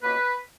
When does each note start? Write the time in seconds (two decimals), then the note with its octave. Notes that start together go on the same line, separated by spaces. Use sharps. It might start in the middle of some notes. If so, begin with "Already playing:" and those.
0.03 C#2 B2 A#3 B4